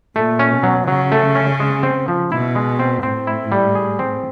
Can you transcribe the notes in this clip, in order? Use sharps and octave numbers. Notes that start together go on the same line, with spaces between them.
A#2 A3
C#4
B2
F#3
C#3 F#3
A3
C#4
G#3
C4
F3
B2 E4
G#3
C4
A2 C4
E4
G3
G#4
C4